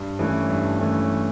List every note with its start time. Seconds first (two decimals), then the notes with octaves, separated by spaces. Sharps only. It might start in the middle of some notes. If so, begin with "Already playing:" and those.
Already playing: G2
0.19 E3 A3 C#4
0.49 G2
0.79 E3 A3 C#4